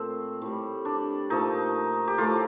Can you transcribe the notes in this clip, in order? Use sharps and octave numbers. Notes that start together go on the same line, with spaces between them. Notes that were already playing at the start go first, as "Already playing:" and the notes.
Already playing: A#2 A3 C4
A2 G3
D4
A#2 F3 A3 D#4
G4
A2 F3 A3 F4